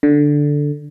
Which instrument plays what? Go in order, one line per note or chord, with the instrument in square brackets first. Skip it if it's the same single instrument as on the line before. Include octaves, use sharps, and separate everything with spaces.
[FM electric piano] D3